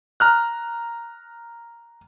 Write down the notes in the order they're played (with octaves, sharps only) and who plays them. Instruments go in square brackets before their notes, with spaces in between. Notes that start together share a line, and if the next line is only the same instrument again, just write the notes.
[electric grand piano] A#5 F6 F#6